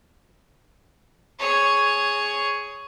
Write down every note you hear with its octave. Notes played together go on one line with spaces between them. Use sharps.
G#4 C#5